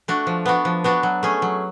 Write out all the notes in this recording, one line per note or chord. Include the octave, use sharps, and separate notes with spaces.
A3 D4 F#4
F3
B3 D4 F#4
F3
B3 D4 F#4
F#3
A3 C#4 G#4
F#3